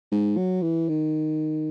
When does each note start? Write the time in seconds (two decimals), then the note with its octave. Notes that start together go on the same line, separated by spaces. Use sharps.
0.12 G#2
0.37 F#3
0.62 E3
0.89 D#3